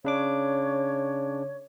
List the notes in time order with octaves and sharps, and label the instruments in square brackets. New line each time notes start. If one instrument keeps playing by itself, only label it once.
[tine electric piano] C#3 D4 D6 [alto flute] C#5